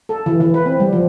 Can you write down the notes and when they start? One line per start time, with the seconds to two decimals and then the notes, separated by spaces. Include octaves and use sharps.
0.09 A4
0.26 E3
0.40 E3
0.54 B4
0.66 C4
0.80 G3
0.93 F3